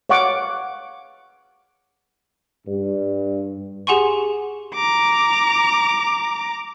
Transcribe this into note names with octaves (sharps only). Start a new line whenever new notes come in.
C#5 F5 F#5 C#6 D6
G2
G4 G#4 F#5 G#5 C6 C#6
A#5 D6